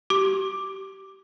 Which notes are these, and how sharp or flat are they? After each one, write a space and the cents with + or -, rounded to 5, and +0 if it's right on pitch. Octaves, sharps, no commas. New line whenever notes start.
G4 -25 D6 +0